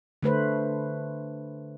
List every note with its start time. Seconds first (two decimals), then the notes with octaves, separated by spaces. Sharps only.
0.23 D3 A3 B4 C5